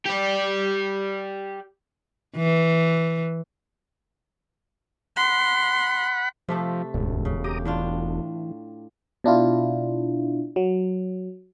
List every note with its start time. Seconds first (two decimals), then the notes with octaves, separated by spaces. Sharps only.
0.06 G4 D5
2.37 E3
5.17 F#5 B5 C6
6.49 C3 F3 A3 A4
6.94 E1 D2 G#2
7.25 C#3
7.44 G4 A#5 D6 D#6
7.65 A2 E3 D4 F4
9.24 B2 D4 E4 F4
10.56 F#3